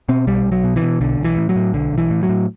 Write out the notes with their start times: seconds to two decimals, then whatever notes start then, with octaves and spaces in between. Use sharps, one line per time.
0.09 B2 C4
0.27 B1 G3
0.45 B1
0.52 F#3
0.64 B2
0.76 E3
0.82 B2
1.01 B1 D3
1.19 B1
1.24 E3
1.37 A2
1.49 F#3
1.56 A2
1.73 B1 D3
1.92 B1
1.98 E3
2.11 A2
2.23 F#3
2.29 A2